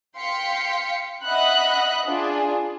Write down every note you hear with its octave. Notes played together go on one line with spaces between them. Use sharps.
F5 G5 C6 B6 C#7
D#5 E5 F#5 B5 F#6
D4 F4 G#4